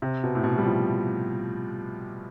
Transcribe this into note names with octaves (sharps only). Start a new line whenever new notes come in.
C3
B2
A2
B2
G3
F3